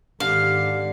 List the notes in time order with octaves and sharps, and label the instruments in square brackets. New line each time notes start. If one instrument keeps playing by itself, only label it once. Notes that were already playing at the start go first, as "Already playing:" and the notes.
[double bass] G#1 [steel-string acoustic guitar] D3 [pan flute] G4 [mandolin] F5